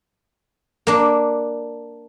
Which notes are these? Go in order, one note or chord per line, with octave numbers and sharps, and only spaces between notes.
A#3 D4